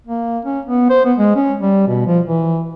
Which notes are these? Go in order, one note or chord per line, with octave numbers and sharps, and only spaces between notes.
A#3
C#4
B3
C5
B3
G#3
C#4
G3
B2
F3
E3